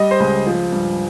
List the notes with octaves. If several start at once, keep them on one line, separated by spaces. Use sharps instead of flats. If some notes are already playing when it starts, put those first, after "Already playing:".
Already playing: G3 D#5
C5
C#2
F3
G2